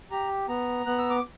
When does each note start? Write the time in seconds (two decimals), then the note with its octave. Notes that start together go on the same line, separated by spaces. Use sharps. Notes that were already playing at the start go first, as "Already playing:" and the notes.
0.11 G4 A#5
0.48 B3 A#5
0.86 B3 F#6
0.98 E6
1.10 D6